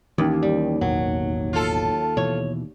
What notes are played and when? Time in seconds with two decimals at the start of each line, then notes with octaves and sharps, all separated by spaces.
0.18 D#2 E3 C#4
0.43 G3
0.81 A1 E2 B2 F#3
1.53 F4 A4
2.17 B2 E3 C#5